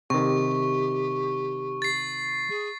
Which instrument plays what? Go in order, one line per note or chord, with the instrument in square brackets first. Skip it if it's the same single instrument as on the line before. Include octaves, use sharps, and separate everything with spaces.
[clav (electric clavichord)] C3 D#3 [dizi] G4 [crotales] C#6
[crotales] A6 C7
[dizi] G#4